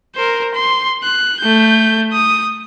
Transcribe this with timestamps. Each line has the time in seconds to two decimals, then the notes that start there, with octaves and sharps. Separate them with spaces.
0.15 A#4 C5
0.54 C6
1.03 F#6
1.41 A3 G6
2.12 D#6